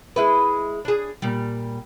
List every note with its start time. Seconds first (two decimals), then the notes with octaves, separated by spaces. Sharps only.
0.16 G#3 E4 B4
0.85 D4 G#4
1.22 A#2 G3